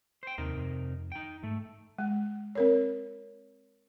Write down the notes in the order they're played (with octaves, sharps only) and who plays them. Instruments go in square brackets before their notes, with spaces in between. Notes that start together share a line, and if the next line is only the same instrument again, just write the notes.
[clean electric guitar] C5 G5
[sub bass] D#2 [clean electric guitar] C3 D#4 A#4
[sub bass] F2
[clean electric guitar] D#4 G5
[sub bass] G#2 [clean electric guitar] A3
[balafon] G#3
C4 A#4 C#5